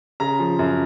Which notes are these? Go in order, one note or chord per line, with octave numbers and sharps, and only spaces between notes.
C#3 A#5
F3
F#2